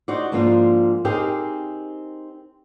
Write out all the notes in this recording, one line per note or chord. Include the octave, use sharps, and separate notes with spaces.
D#4 F#4 C5 D5
G#2 F3 A#3 D4 F4
C4 D#4 G4 G#4 A#4